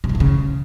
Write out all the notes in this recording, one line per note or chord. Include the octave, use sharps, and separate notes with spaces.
C3
G3
E3
C#3